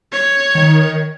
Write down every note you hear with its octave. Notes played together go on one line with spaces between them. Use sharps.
C#5
D#3